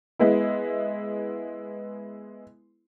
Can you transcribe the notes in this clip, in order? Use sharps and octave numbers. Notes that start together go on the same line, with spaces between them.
G#3 B3 E4